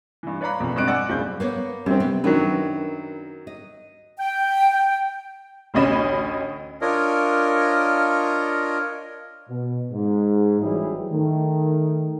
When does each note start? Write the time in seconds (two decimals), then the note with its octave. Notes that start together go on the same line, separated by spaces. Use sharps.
0.23 G2 E3
0.41 B4 C#5 D5 F5 A#5 B5
0.60 A#1 F2 B2
0.75 G#1 G2 C4 D#5 F#6 D7
0.87 D5 F#5 G#5 E6
1.08 E1 B1 G2 C#3 C5 G6
1.40 A#3 B3 C#5
1.86 F#2 G3 C4
2.00 C3 B3
2.24 F#2 D#3 F#3 D4 B4
3.47 D#5
4.19 G5
5.74 A1 D2 C#4 D#5 B5 E7
6.82 D4 F4 A#4 C#5 D#5
9.49 B2
9.92 G#2
10.61 A1 E3 F#3 G3 E4 G#4
11.11 D#3 A3